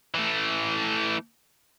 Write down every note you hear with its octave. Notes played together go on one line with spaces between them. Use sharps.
E3 A3